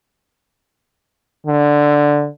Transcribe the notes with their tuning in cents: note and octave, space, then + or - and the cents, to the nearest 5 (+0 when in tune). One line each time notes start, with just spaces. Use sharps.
D3 +0